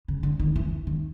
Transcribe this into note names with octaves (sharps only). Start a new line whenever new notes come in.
C#3
D3
D#3
E3
D#3